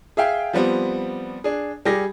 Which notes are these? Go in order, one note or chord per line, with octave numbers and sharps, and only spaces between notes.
G#4 E5 F5 G5
F3 G3 B3 C4
D4 G#4
G3 G4 G#4 A#6